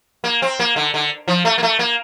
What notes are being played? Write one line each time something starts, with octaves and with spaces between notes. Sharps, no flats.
A#3
C4
A#3
D3
D3
F3
A3
A#3
A3
A#3